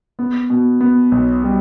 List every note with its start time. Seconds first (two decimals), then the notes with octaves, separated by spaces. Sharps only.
0.19 B3
0.50 B2
0.81 B3
1.12 B1
1.44 G3